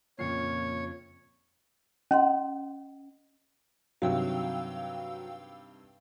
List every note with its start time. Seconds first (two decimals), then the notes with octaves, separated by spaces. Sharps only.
0.19 F2 A#2 C#3 C#5 C7
2.11 C#4 D#5 F#5 C6
4.02 G2 C3 D#3 F#3 F5 G5 E6